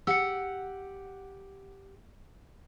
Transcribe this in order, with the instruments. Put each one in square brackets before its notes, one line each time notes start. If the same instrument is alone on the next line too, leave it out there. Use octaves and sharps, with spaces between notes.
[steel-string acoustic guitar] G4 F#5 [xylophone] E6 C#7